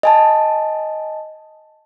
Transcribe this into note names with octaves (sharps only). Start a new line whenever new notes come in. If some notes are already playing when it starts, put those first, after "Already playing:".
D#5 G#5 A5